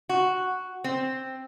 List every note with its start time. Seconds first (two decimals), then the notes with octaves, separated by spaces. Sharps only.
0.09 F#4
0.84 C4